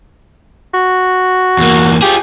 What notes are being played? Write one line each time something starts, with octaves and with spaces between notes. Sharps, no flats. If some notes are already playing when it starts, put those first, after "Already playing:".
F#4
E2 A#3
F4 G4 G#4